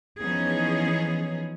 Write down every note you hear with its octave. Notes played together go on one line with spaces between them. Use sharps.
E3 F3 B3 C#4 D#4 G#4